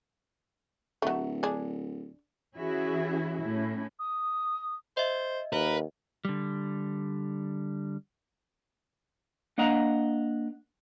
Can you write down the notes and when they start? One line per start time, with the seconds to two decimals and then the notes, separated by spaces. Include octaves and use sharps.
1.02 D1 F#3 A3
1.43 D4 G#4
2.57 E3 C#4 E4 F#4 G#4 E5
3.40 A2 C#4 E4
3.99 D#6
4.97 C5 D#5 E5
5.53 D#2 A#4 B4
6.25 D3 G3
9.58 A#3 D4 D#5 F#5 A#5